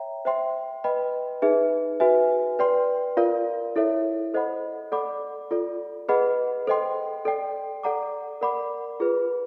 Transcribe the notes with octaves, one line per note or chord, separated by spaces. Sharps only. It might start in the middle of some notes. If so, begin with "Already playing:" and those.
Already playing: C#5 E5 G5 A#5
C5 E5 G5 C6
B4 D#5 G5 B5
D#4 G#4 B4 E5
F#4 B4 E5 G#5
B4 D5 G5 C6
F4 A#4 D5 F5
E4 A4 C#5 E5
A4 C5 D#5 F#5 B5
A4 D5 F#5 B5 D6
F4 A4 D5
G#4 B4 D#5 F#5 B5
A4 C5 D#5 G5 C6
A4 D5 G5
A4 D5 F#5 A#5 D6
A#4 D5 F#5 B5 D6
F4 G#4 B4